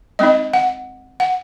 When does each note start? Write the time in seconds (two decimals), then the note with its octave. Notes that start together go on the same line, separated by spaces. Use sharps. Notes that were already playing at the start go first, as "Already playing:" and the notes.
0.19 G#3 C4 D#4 D#5
0.53 F#5
1.20 F#5